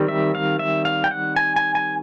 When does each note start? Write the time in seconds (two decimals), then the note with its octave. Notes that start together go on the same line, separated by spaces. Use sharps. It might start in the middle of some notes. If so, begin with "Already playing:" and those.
Already playing: D#3 G3 C4
0.08 E5
0.35 F5
0.59 E5
0.85 F5
1.04 G5
1.11 F#5
1.36 G#5
1.56 G#5
1.75 G#5